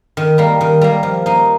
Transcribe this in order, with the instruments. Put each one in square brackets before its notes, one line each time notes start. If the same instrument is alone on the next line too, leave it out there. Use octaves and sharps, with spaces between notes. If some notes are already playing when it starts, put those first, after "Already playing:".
[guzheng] D#3
G3 A#3
D#3
G3 A#3
F3
A#3 D#4